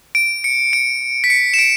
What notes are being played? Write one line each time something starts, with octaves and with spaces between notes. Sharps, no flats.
D7
C#7
D7
B6
C#7
E7
D7